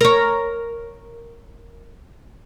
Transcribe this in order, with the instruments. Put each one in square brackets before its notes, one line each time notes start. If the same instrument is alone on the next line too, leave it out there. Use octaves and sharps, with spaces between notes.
[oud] A#4 C#5